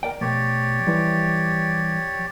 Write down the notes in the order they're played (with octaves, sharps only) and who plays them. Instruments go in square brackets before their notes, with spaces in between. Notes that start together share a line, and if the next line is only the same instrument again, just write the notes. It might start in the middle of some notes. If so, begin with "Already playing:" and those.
[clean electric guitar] A#4 D5 G5
[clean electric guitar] B2 F3 A3 [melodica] G4 C#5 D5
[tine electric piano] E3 G3 [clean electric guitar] F3